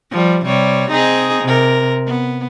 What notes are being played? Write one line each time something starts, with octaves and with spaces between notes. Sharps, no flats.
F3 G3
C3 G3 C#5
C4 D#4 G#4
C3 A#4
B3